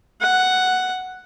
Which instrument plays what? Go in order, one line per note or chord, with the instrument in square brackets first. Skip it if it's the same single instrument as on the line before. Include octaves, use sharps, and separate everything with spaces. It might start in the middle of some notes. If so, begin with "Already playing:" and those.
[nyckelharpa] F#5